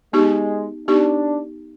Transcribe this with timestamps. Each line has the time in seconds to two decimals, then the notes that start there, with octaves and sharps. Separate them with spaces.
0.13 G#3 B3 D#4 G4
0.87 B3 D4 D#4 G4